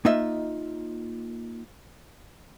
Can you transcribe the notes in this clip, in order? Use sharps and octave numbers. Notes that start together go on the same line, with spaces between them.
A#3 D#4 F4 D#5 E5